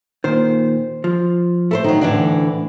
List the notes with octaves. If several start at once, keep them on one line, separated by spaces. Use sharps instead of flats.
A#2 D#3 C5
F3
A3 A4 A#4 C5
D#3 F#3 D#4
D2 A2 D3 E3 D4